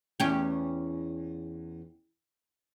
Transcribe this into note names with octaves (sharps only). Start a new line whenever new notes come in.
E2 C#4 G4